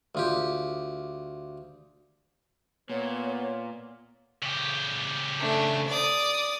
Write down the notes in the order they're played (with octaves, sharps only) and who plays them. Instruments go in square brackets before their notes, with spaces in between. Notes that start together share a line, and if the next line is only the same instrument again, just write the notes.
[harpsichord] D2 F4 G4
[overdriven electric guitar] A#2 [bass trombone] B3 [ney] C#5
[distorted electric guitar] C#3 G4
[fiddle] A3 D4
D5 D#6